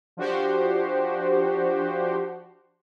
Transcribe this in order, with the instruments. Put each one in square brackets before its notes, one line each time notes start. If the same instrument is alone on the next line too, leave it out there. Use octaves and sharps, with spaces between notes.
[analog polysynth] F3 D4 F#4 G4 C5